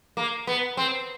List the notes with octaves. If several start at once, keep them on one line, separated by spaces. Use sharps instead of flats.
A#3
B3
C4